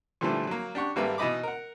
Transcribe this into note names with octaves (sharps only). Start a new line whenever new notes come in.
A#2 D3 E3 F3 G3 A3
F#3 A#3
D4 G4 F#5 C#6
G#1 G3 A#3 A4 B4 E5
B2 E3 D#4 D#5 B5 D6
A#4 F#5